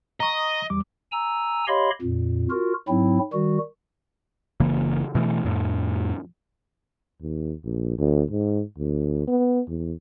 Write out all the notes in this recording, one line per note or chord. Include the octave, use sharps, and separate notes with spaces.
D#5 A#5 C#6
E2 G3 D6
G#5 A#5 E6
G4 C#5 D#5 F5 B5 C6
F2 A#2
F4 F#4 A#4
G#2 F#3 C4 E4
D#3 G3 F#4
F#1 C#3 E3 A#3
B2 E3 A3
F2 A2
D#2
A#1
D2
G#2
D2
B3
E2